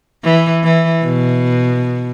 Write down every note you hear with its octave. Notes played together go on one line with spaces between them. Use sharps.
E3
E3
B2